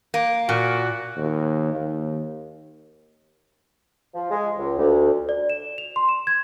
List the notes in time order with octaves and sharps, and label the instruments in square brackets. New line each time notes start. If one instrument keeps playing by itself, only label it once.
[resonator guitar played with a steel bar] A#3
[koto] A#2 [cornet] F#4
[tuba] D#2
D#2
[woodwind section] F3
G#3
C#2
D2
[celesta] D5
E7
F7
C6
E7
G#6